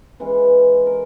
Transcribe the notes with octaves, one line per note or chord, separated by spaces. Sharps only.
E3 G#3 C#4 B4
A#4